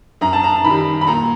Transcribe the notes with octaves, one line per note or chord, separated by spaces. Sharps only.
F#2 A#5
A5
A#5
D#3 G3 B5
B5
A#2 A#5